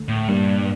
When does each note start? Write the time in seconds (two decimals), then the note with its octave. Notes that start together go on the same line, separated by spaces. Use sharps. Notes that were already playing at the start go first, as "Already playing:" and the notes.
Already playing: D2 D3 A3
0.08 A2
0.28 G2 A#2 G3 A#3 D4